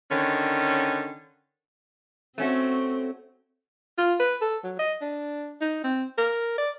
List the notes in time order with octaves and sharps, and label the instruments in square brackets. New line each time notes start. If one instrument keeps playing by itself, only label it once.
[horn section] D3 D#3 C#4
[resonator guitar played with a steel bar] A3 C#4 F#4 [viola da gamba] C4
[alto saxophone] F4
B4
A4
F#3
D#5
D4
D#4
C4
A#4
D5